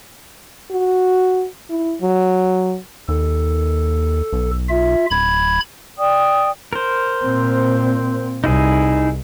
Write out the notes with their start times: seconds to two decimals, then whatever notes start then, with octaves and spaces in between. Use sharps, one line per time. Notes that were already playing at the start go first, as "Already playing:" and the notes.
0.71 F#4
1.69 E4
2.01 F#3
3.08 D#2 A4
4.33 B1
4.69 F4 E5
5.11 D1 B5 G#6
5.97 D5 G5 D#6
6.73 A#4 C5
7.23 A#2 C4
8.44 C2 D#4 E4 G#4